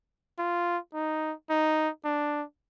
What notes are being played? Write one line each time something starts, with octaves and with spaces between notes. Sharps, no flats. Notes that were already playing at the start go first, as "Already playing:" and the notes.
F4
D#4
D#4
D4